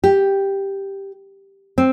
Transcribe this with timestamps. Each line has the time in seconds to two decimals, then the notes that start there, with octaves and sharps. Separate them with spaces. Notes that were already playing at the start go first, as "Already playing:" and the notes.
0.04 G4
1.78 C4